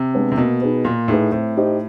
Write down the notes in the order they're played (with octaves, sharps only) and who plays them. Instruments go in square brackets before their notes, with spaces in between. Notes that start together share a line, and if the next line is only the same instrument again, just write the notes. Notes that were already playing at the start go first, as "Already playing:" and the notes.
Already playing: [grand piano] C3
[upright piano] G#3 B3 D4
[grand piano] C3
[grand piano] B2 [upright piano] A#3
[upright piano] D#4 G#4 B4
[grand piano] A#2 [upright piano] A#3
[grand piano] A2 [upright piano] D#4 G#4 B4
[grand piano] A2 [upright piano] C4
[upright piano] D#4 G4 C5 D#5